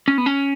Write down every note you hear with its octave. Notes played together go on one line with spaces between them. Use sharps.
C#4
B3
C#4